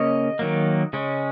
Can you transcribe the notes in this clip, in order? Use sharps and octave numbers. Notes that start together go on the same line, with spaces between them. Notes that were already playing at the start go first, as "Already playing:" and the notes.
Already playing: C#3 A#3 C#4 D#5
D#3 F#3 A#3
C#3 G#3 C#4